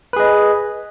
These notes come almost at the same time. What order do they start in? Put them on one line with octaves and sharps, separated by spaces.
B4 G#4 D#5